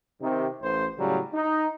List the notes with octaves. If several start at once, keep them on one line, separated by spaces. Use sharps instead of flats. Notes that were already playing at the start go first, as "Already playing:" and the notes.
C3 D#3
A1 C5
A2 C#3 F#3 G3
D#4